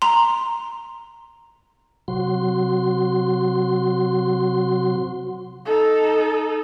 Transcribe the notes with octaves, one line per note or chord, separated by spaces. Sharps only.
A#5 C6
C3 F#3 F#4 C6
D#4 A4